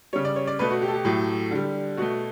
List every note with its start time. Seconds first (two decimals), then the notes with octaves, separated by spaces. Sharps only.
0.13 C#3 G3 C#5
0.25 D5
0.36 C#5
0.47 D5
0.59 B2 A3 B4
0.71 F#4
0.82 G4
0.88 A4
0.94 G4
1.05 A2 F#3 A3
1.51 D3 G3
1.97 B2 A3 F#4